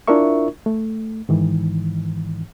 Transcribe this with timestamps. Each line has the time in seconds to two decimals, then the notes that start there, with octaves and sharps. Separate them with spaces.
0.08 D4 E4 F4 A#4 E5 C#6
0.66 A3
1.29 G#2 D#3 E3